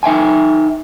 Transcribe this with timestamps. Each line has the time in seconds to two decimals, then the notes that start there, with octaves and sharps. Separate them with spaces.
0.03 D#4 E5 G5 G#5